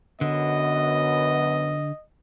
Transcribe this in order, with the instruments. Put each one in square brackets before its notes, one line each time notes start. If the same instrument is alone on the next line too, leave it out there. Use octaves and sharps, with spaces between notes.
[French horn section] F#2 B3 [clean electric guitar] D3 [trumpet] D#5